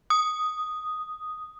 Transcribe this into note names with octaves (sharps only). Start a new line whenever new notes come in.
D#6